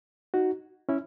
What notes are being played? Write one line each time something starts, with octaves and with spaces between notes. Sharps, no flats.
D#4 F#4
C#4 E4